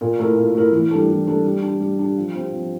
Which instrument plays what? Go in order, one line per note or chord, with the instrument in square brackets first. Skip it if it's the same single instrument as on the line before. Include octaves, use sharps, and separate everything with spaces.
[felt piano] A#2
A3 E4 A#4
A#2
A3 E4 A#4
E3
G3 D4 A4
E3
G3 D4 A4
G3
D4 G4
G3
D4 G4
F3
C4 G4
F3